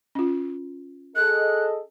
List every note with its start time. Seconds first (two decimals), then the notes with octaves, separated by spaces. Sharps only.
0.15 C#4 F4
1.16 G#4 A4 D#5 F#6